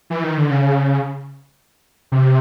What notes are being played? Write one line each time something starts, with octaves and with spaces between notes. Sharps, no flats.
E3
D#3
D3
C#3
C3